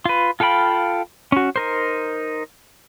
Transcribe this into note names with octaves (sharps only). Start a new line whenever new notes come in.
F4 B4
F4 A4 F5 G5 B5
C#4 F#4
D#4 A#4 C5